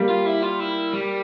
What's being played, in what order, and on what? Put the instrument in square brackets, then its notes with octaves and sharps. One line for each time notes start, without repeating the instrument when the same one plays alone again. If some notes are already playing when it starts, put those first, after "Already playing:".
Already playing: [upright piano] G3 A#3
[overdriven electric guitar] F4
E4
F4
E4
G3